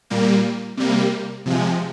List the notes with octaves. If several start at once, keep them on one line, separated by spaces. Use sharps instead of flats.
A#2 G3 A#3
C3 G3 A#3
C3 F3 G#3